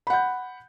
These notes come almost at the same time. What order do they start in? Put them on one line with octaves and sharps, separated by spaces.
B5 F#5 G6